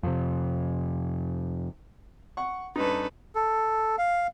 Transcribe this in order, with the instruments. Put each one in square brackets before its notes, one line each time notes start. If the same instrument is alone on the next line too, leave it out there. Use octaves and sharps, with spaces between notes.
[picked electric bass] F2 C3
[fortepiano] F#5 C#6
[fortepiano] G2 D#4 [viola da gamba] C#4 A4 B4
[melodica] A4
F5